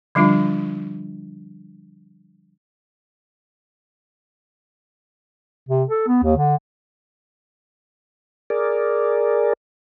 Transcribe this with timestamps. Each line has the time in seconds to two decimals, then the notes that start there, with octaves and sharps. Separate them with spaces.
0.15 D3 F3 G3 D4 F4
5.69 C3
5.89 A4
6.07 B3
6.23 D#2
6.37 D3
8.50 G#4 A#4 D5